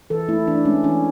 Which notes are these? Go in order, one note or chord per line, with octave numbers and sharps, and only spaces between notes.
E3 A4
A3 E4
E3 D4
G#3 C#4
E3 C#4